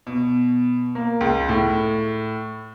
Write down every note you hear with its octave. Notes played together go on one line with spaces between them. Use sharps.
B2
A#3
C#2
A2